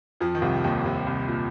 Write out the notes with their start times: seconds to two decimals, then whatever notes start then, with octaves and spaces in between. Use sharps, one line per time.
0.20 F2 F3
0.35 D#3
0.42 C2 C3
0.64 D#2 D#3
0.85 C2 C3
1.07 C2 C3
1.29 A#2